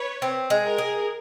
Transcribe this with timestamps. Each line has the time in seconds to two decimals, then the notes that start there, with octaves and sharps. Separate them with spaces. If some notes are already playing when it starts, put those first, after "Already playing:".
Already playing: B4 C#5
0.22 C4
0.50 G#3
0.64 A#4
0.78 G#4